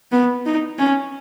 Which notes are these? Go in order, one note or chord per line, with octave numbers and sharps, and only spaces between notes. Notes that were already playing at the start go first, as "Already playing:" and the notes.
B3
D#4
C#4